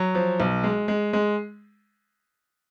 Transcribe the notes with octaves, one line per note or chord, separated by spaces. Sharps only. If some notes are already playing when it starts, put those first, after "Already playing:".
Already playing: F#3
F3
B1
G#3
G#3
G#3